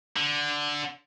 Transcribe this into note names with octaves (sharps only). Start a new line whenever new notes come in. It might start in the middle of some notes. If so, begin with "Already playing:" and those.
D3